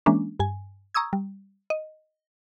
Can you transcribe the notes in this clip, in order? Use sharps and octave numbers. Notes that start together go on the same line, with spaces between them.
E3 G#3 A#3 C#4 D4
G2 G#5
A#5 C#6 D#6 E6 G#6
G3
D#5